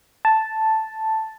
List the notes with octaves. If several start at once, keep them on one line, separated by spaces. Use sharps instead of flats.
A5